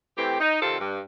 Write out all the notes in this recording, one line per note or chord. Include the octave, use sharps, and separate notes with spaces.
E3 A3 C4 G4
D#4
C3 D#3 C4 F4 A4
G2